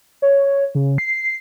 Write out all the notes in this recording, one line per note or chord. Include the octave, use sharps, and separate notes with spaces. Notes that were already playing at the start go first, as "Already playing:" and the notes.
C#5
C#3
C7